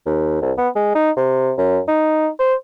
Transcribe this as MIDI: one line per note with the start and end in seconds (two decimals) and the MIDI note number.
0.06 0.39 39
0.41 0.52 36
0.58 0.69 59
0.75 0.92 56
0.95 1.11 63
1.16 1.52 48
1.58 1.80 42
1.88 2.28 63
2.39 2.54 72